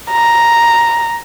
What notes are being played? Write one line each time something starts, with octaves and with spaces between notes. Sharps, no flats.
A#5